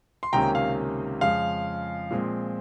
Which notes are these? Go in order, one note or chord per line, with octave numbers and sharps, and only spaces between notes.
C6
C#2 C3 D#3 A#3 C#4 G5 A#5
F5
F2 C#3 G#3 F5
A#2 F3 G#3 C4